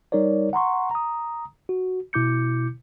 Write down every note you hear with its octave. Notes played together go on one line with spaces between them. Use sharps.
G3 D#4 A#4 C#5 D5
F#5 A#5 C6 C#6
A#5 D#6
F#4
B2 E4 D6 G6 C#7